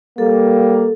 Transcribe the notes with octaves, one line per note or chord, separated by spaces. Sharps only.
G3 A#3 A4